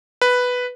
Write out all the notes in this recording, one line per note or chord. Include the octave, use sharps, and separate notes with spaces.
B4